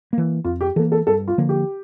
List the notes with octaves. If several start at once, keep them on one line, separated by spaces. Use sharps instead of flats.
E3 A#3
F2 F4
G4
E3 A#3 A4
A4
G2 A4
F4
D3 F3 A#3
G4